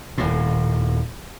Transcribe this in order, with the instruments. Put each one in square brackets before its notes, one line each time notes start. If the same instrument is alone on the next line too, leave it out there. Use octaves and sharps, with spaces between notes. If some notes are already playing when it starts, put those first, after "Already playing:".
[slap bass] D#1 A2